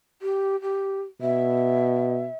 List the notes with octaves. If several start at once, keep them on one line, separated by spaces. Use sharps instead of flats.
G4
G4
B2 E5